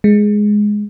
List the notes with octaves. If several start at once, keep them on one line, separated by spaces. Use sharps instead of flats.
G#3